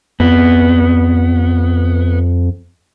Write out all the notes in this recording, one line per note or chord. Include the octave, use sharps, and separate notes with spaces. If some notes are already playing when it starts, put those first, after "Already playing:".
F2 B3